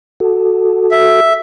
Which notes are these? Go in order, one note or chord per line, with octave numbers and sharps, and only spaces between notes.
F#4 A4
E5